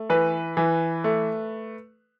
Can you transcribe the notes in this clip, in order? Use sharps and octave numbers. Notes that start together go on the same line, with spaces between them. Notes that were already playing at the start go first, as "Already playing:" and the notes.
Already playing: A3
E3 B4
E3
A3